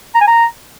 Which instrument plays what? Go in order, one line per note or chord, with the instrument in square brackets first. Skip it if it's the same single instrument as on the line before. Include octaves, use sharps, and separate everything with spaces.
[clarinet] A#5
G#5
A#5